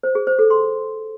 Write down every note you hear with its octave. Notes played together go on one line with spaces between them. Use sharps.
C5
G#4
C5
A4
C6